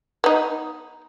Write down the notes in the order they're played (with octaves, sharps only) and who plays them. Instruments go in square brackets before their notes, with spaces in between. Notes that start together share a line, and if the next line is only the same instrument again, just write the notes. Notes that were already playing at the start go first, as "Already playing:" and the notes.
[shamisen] B3 D#4